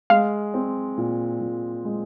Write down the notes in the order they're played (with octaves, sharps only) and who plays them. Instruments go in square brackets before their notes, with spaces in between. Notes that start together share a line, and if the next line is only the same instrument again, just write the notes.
[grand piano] G#3 [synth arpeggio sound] F5
[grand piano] C4
A#2
A#2
G#3